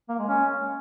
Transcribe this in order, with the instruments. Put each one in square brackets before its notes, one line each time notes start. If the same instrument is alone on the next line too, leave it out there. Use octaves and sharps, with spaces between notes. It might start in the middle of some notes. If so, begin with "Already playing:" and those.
[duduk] A#3
G#3
C#4